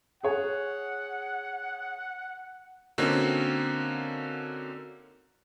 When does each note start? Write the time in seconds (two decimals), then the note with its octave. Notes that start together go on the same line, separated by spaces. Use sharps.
0.23 G#4 C#5 F#5
2.98 D3 A#3 C4 C#4 D#4 F#4